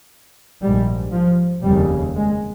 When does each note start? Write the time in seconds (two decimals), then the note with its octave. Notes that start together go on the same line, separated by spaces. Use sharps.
0.62 A#1 G#2 G3
1.12 F3
1.63 F1 D#2 C#3 G3
2.15 G#3